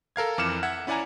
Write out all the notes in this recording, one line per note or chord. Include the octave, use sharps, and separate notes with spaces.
A4 A#4 F5 G#6
F2 E3 D6 F6 C#7 E7
E5 F#5 G#6
C#4 E4 D5 F#5 G#5 A#5